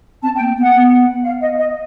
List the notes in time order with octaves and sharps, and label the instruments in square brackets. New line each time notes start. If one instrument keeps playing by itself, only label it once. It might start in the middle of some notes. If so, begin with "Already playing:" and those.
[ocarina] C4 [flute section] A5
[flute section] G5
[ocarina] A#3
B3
[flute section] F#5
[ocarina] B3
[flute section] F5
D#5
D#5